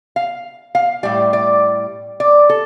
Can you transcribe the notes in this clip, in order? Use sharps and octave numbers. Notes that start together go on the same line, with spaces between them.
F5
F5
A2 G3 D5
D5
D5
A4